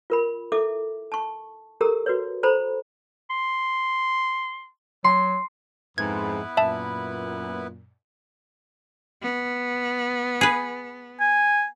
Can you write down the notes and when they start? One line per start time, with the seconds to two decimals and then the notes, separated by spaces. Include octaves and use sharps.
0.10 F4 A#4 B5
0.52 E4 A4 E5 D6
1.12 A5 C#6
1.81 G4 A4 A#4 A#5 E6
2.06 F#4 B4 C#5
2.43 A4 C5 A#5 B5
3.30 C6
5.04 F#3 C6
5.98 F2 G#2 B3 E4 B4 G#6
6.57 F#2 A#2 E5 A5
9.22 B3
10.41 G#4 B4
11.20 G#5